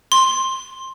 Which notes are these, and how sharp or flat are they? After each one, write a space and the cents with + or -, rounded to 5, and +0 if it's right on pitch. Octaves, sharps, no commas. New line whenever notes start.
C6 +15